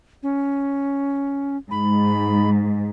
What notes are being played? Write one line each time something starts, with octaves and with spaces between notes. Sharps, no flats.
C#4
G#2 B5